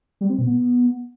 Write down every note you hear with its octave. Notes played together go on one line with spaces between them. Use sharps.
G3
C4
B2
B3